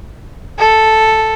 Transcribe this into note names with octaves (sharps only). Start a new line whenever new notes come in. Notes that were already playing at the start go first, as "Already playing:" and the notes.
A4